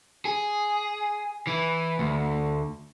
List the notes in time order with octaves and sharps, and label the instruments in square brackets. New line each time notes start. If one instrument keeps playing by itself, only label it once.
[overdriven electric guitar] G#4
E3
D2